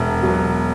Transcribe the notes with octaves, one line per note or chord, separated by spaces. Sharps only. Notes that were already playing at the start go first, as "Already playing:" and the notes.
Already playing: E1 E5
B2 F#3